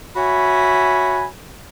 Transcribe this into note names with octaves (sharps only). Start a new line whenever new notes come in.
F#4 C#5 E5 G#5 B5